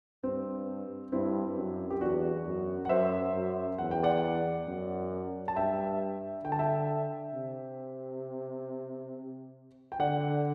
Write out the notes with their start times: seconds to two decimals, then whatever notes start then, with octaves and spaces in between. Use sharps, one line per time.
0.24 G2 C4
1.12 G2 C4 E4
1.56 F#2
1.90 G4
2.00 E2 D4 F#4
2.46 F#2
2.85 F#5
2.89 F#2 C5 E5
3.34 F#2
3.78 E2 F#5
3.91 G5
4.03 D5 F#5
4.67 F#2
5.48 A5
5.56 G2 E5 G5
6.44 D3 G5
6.52 A5
6.59 E5 G5
7.34 C3
9.92 G5
10.00 D3 D5 F#5